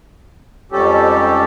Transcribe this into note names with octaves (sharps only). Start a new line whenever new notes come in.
F2 G#2 G3 C#4 G4 A4